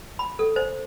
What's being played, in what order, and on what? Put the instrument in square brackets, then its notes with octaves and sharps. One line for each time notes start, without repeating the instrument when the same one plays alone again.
[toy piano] B5
A4
C5